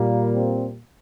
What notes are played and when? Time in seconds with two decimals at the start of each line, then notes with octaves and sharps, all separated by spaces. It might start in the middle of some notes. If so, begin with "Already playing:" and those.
Already playing: A#2 G3 A#3
0.35 C4